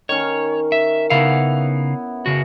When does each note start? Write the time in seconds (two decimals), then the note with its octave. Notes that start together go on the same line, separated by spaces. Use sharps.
0.09 D#3 C#4 C#5
0.72 E5
1.10 C#3 B3 D#4 E4 F5
2.26 C#3 F#4